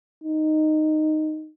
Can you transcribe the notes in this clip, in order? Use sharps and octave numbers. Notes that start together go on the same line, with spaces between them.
D#4